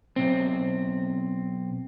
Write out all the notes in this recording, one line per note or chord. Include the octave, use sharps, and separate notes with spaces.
B1 C4